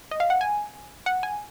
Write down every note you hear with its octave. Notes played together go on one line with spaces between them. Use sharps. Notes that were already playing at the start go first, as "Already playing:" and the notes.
D#5
F5
F#5
G#5
F#5
G#5